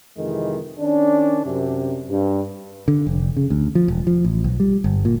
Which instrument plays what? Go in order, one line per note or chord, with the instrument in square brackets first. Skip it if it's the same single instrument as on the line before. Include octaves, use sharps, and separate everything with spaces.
[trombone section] F2 C3 D#3 E3 G#3
D#3 C#4 D4
F#2 C3
G2
[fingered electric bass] D3
F1
C#3
D2
F3
E1
F3
A1
B1
G3
G1
A#2